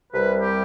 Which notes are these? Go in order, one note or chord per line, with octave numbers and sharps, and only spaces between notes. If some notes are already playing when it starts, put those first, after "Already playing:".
C2 C3 G3 B4
G4